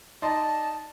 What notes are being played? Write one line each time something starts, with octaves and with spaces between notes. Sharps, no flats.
D#4 D5 A5 C6